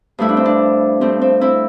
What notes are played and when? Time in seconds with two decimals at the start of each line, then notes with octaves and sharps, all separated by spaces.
0.18 G2 F3 A3 E4
0.29 D4
0.37 C4
0.45 D4
1.01 G2 F3 A3 C4
1.21 C4
1.41 C4 E4